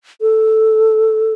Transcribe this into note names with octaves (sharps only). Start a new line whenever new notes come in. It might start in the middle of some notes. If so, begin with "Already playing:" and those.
A4